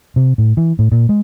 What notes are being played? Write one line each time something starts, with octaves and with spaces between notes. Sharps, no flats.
C3
A2
E3
A2
A#2
G#3